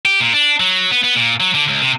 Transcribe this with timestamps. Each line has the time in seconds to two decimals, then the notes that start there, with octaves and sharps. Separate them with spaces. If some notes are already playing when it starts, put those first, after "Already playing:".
0.05 G4
0.20 A#2
0.33 D4
0.60 F#3
0.91 B3
1.04 B3
1.16 A#2
1.40 F#3
1.55 D3
1.68 C#2
1.82 C3